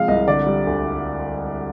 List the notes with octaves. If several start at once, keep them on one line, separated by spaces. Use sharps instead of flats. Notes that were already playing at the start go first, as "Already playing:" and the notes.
Already playing: C3 F3 G#3 F5
C2 D#5
D3 D5
G3
D2